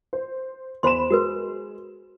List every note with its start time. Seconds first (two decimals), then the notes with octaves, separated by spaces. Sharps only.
0.13 C5
0.83 E2 C5 B5 C6 E7
1.10 G#3 F#4 A#4 B4